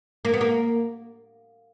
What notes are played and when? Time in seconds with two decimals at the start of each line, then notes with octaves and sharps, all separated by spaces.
0.25 A#3
0.34 B3
0.41 A#3